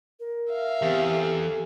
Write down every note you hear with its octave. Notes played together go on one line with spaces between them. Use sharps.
A#4
E5 F5
E2 C4 G4
A4